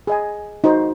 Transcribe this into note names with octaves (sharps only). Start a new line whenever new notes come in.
G#4 D#5 G#5
D#4 F#4 C5